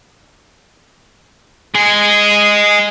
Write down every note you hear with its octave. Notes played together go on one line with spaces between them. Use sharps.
G#3 G#4